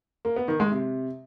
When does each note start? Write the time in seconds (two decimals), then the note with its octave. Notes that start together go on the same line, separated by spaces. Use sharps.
0.25 A#3
0.36 B3
0.48 D#3
0.60 G#3
0.71 C3